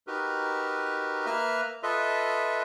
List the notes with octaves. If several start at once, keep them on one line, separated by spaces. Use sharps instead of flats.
D#4 F#4 G4 A#4 B4
A#3 B4 E5 A#5 F6
F4 A4 B4 D#5 E5